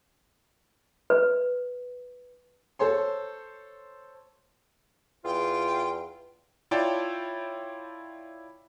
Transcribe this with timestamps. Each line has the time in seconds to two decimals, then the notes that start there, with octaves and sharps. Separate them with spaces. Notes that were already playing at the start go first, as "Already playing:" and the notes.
1.10 B4
2.79 A4 C5 C#5 C6
5.24 E2 F4 G5
6.71 E4 F4 C#5 D5 G5 A5